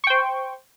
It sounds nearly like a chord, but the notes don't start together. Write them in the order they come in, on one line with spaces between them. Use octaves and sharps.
C#6 G5 C5